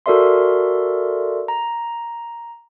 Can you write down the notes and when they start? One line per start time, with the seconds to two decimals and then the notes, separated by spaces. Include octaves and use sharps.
0.06 F#4 A4 A#4 D5 E5 C6
1.48 A#5